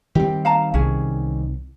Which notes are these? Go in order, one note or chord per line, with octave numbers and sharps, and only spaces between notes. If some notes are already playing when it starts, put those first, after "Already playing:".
D#3 G3 C4 G4
F5 A5 A#5
C2 C#4 G#4